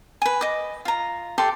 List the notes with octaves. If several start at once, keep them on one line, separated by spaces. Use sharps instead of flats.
B4 G#5
D#5 D6
F4 A#5
G4 A4 D5 C6